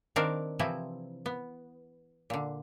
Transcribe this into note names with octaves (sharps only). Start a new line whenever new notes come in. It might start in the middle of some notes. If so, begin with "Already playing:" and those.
D#3 C4 D4 A#4 F5
C3 E3 F3 C4 E4
B3
A#2 D3